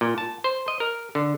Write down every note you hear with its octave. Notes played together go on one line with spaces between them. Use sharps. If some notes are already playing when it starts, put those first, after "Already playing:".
A#2
A5
C5
D#5
A#4
D3